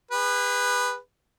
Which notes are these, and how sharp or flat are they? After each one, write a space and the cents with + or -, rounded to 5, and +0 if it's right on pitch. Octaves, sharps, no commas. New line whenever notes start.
G#4 -45 B4 +0